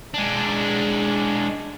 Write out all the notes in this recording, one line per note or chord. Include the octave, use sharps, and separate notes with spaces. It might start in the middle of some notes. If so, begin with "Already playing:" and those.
G#3 D4